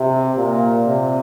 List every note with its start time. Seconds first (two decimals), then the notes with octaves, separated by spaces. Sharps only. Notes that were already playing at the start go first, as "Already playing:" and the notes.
Already playing: C3
0.37 A#2
0.87 C3